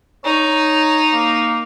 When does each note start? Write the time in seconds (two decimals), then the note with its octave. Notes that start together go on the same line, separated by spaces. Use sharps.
0.24 D#4 C#5
1.13 A#3